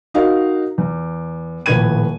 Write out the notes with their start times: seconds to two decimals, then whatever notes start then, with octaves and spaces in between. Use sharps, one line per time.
0.14 D#4 F#4 A#4 D#5 F5
0.78 E2
1.66 D#1 A2 F3 B4 G#6 D#7